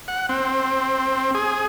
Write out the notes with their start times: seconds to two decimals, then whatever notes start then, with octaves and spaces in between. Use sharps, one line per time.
0.08 F#5
0.29 C4
1.35 G#4